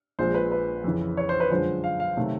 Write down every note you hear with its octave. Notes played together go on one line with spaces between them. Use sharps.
A#1 A#2 F3 G#3 C5
B4
B4
F2 C#3 E3
C#5
C5
B4
F#2 D3 F3 G#3 C5
F5
F5
C3 D#3 F#3 A3